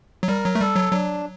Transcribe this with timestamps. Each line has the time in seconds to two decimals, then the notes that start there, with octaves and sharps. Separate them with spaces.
0.23 F#3
0.28 G3 A#4
0.45 F#3
0.55 A3
0.60 G3 A4
0.77 F#3
0.92 F#3 D4